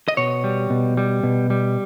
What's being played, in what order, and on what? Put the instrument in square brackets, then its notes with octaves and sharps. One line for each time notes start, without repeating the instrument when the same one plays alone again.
[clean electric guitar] D#5
B2 C#5
G3
B2
G3
B2
G3